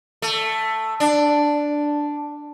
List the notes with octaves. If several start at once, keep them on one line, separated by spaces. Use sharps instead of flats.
A3
D4